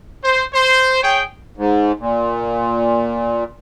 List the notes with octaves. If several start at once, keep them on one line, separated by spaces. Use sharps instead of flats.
C5
C5
G#4 C#5 G5
G#2
A#2